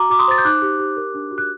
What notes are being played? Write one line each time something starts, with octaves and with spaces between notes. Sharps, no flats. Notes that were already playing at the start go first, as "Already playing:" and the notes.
Already playing: F#4 A#5 D6
F#4 D6
C6 D#6
C5 A6
G6
D#4 D6 F#6
G4
G4
A#4
D4
F#4
F#6